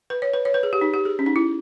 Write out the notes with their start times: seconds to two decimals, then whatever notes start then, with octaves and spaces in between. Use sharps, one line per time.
0.10 B4
0.22 C#5
0.34 B4
0.45 C#5
0.54 B4
0.63 G#4
0.73 G4
0.81 D#4
0.94 G4
1.05 G#4
1.19 C#4
1.26 D#4
1.36 E4